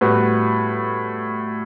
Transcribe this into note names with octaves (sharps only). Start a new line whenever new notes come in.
A2 G3 B3 F#4 B4